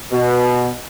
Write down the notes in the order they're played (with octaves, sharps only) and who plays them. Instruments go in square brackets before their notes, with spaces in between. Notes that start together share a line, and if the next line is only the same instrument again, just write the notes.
[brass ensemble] B2